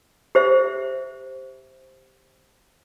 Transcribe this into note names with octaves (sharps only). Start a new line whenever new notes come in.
G4 C5 E5